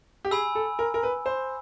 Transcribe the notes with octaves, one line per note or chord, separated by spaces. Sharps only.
G4
G#4 G#5 B5 E6
A4
A#4
A#4
B4
C5